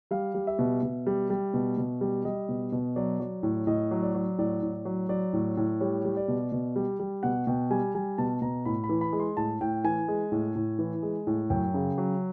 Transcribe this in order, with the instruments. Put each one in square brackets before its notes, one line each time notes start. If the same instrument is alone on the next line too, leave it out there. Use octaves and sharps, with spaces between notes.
[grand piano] G3 F5
G3
E5
B2
B2
G3
G3
B2
B2
G3
G3 D#5
B2
B2
F#3 D5
F#3
A2
A2 D#5
F#3
D5
F#3
A2 D5
A2
F#3
F#3 D5
A2
A2
G3 C#5
G3
D5
B2
B2
G3
G3
B2 F#5
B2 G5
G3 G#5
G3 G#5
B2 A5
B2 A#5
A2 B5
B5
E3
B5
G#3
C6
A2 A5
A2 G5
E3 G#5
G#3
A2
A2
E3
G#3
A2
F#2 G5
C#3
F#3